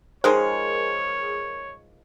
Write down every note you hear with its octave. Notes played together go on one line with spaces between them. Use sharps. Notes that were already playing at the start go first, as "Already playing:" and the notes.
D#3 F3 G#3 G#4 A#4 C5 C#5